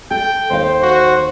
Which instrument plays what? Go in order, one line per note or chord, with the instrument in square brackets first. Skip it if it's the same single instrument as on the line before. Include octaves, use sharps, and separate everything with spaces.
[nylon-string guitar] A4 [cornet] G5
[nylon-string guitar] D#2 F5 [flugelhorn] C5
[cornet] F#4